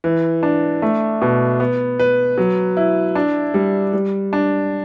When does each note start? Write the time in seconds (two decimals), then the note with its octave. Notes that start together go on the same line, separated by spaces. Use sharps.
0.04 E3
0.43 D4
0.82 A3
1.22 B2
1.60 B3
1.99 B4
2.38 F#3
2.77 E4
3.15 D4
3.54 G3
3.93 G3
4.33 D4